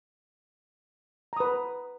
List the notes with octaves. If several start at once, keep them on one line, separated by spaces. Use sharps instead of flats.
B4 A#5 D#6